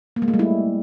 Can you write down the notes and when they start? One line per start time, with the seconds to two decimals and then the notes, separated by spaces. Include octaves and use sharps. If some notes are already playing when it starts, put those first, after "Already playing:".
0.16 A#3
0.22 G#3
0.28 A3
0.34 G3
0.39 E4